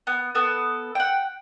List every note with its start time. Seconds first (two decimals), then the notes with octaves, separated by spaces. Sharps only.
0.07 B3
0.35 B3 A4
0.95 F#5 G5